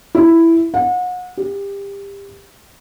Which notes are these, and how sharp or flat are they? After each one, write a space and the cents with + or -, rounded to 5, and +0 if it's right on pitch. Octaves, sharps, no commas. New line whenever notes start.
E4 +5
F#5 -35
G4 +25